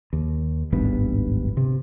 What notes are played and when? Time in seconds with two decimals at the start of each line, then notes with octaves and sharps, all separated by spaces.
0.13 D#2
0.72 D1 G#1 G2 B3
1.57 C3